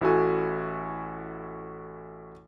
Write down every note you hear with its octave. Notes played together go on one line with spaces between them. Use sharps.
A1 E4 F#4 A4 G#5